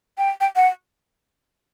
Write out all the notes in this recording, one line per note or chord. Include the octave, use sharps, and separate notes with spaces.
G5
G5
F#5